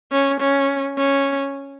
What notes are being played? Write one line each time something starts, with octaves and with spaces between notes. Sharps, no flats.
C#4
C#4
C#4